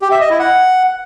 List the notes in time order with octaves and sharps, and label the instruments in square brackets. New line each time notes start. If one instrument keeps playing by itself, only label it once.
[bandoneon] G4
E5
D#5
E4
F#5